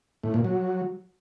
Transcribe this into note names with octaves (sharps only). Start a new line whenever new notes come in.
A2
A#2
F#3